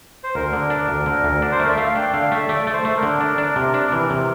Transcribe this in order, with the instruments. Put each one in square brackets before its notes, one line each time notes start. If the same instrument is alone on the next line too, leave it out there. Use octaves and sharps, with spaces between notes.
[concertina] C5
[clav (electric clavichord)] D2 [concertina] A#4
[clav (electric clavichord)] D3
D4
D2
D3
D2
D4
[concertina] C5
[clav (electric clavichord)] A3 [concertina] D5
[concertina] E5
[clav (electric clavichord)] A3 [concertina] F5
[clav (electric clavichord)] D4 [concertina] G5
[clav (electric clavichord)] D3 [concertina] F5
[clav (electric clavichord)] A3 [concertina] E5
[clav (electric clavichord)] A3 [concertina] D5
[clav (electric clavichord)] A3
[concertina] C5
[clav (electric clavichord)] A3
[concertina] A#4
[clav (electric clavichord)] D3
D4
D4
C3
D4
E3
C3